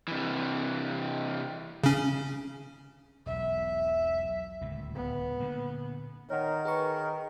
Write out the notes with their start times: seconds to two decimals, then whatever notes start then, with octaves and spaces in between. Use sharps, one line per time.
0.08 C3 E3
1.84 C#3 C#4
3.26 E1 B1 E5
4.61 D1 C#2 A#2
4.95 B3
5.40 A#2 D3
6.30 D#3 A#4 C#5 D#5 F#5
6.65 G#4 B4 C#6